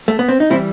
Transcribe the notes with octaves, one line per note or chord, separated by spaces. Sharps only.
A3
B3
C4
D#4
E3 G3 C4 E4